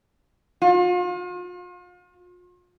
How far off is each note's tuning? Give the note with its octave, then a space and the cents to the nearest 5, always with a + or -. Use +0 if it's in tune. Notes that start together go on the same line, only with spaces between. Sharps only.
F4 +40